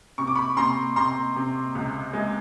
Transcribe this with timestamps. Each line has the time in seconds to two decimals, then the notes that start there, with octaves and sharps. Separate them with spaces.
0.18 C3 C#6
0.27 D6
0.35 B5 C#6
0.57 C3 A#5 C6
0.96 C3 A#5 C6
1.36 C3
1.75 C#2
2.13 G#3